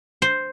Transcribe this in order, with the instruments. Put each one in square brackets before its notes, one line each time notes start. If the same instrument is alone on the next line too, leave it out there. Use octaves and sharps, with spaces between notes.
[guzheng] C5